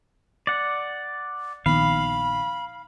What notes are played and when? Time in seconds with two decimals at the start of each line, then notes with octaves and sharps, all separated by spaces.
0.47 D5 F#5
1.66 A#1 D#3 B3 F5 B5